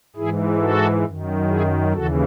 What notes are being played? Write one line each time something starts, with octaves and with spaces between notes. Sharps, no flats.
G#2 E3 E4 G#4
F#4 A4
F#2 D#3
E4 G#4
D#2 C#3 E3 F#4 A4